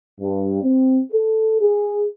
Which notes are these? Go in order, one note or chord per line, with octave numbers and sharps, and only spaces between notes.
G2
C4
A4
G#4